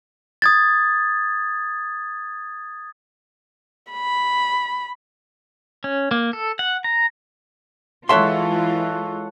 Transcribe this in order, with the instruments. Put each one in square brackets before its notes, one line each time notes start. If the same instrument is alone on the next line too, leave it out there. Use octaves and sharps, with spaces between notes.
[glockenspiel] D#6 G#6 A6
[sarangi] B5
[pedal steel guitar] C#4
A#3
A4
F#5
A#5
[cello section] E3 G#3 F4 [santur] A4 C#5 F#5 [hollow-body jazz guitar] E5 C6